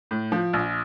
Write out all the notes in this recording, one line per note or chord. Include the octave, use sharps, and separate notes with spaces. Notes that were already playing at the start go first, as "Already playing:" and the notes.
A2
F3
A#1